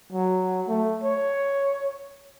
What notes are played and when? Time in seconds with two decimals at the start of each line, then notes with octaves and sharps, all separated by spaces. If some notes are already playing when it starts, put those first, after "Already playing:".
0.13 F#3
0.68 A3
1.03 C#5